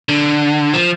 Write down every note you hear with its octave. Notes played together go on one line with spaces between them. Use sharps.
D3
F3